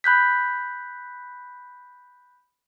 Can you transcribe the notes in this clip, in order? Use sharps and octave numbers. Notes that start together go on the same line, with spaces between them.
B5 F#6 G6 B6